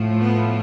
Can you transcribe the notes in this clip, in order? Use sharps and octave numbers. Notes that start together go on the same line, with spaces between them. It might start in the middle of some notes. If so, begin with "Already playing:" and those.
Already playing: A2 F3 A3
B3